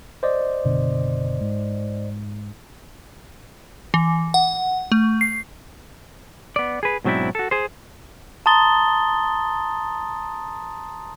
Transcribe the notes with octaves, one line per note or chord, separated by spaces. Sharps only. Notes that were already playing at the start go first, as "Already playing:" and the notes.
C5 D5 D#5
F#1 B2 D3
G#2
E3
F#5
A3
C7
B3 D5
G#4 B4
G#2 B2 F#3 C4 D4 E4
F#4 A4
G#4 C5
A5 A#5 C6 D#6 A6 G7